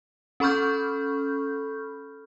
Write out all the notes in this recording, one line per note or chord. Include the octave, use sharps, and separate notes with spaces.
C#4 A4 B5 C#6 F6 G6